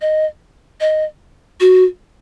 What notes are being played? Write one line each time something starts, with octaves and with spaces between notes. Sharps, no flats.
D#5
D#5
F#4